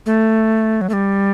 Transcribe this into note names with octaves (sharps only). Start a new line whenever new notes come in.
A3
F#3
A3
G3